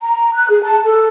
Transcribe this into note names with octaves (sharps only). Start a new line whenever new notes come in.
A#5
F#6
G#4
A5
A4